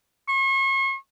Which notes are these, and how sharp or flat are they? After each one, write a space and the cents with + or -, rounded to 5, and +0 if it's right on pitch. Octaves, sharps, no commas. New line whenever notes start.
C#6 -40